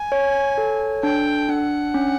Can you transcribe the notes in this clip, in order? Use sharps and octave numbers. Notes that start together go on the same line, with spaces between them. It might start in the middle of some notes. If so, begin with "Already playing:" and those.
Already playing: G#5
C#5
A4
D4 G5
D4 F#5
C#4